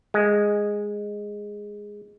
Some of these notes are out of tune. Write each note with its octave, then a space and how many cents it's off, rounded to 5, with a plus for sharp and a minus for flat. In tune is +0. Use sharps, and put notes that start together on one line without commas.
G#3 -5